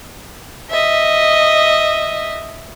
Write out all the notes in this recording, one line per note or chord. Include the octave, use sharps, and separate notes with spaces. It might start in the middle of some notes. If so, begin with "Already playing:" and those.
D#5 E5